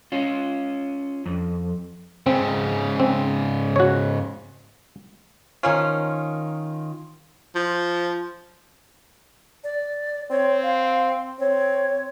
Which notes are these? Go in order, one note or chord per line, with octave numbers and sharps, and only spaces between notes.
C#4 F4
F2
G#2 C#3 C4
C4
F#4 C#5
D#3 F3 A#3 C#4 F4
F3
D5
C4 C#5
F5
C4 C#5